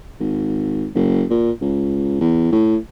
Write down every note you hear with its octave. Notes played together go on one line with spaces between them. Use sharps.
G#1
F#1
A#2
C#2
E2
A2